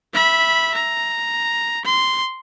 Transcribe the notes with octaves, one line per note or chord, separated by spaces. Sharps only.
E5 B5
A#5
C6